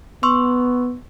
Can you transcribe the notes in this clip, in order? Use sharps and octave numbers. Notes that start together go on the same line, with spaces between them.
B3 C6 C#6 E6